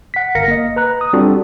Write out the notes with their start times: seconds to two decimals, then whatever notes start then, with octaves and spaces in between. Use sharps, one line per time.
0.14 F#5 B6
0.35 G1 A#4 F5 A#6 C#7
0.48 A#3 D#5
0.76 B4 A#5 F#6
1.01 D#6
1.13 G3 C4 D4 F4 F#4 A4